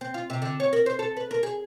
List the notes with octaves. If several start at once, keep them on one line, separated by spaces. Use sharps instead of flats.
C4
F4
C3
D3
C#5
A#4
C5
A4
B4
A#4
G#4